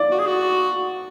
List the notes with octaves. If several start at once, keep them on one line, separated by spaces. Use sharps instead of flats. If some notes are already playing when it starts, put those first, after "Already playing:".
Already playing: D5
F#4
G#4
F#4